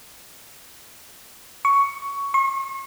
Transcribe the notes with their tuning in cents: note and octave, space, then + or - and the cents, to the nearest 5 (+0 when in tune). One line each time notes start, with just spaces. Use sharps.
C#6 +10
C#6 -40